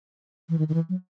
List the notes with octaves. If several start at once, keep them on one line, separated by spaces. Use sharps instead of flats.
E3
D#3
D#3
E3
F#3